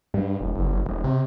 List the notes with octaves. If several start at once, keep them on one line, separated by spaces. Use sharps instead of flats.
G2
E1
F#1
F#1
E1
C3